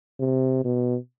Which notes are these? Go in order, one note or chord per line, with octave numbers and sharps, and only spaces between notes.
C3
B2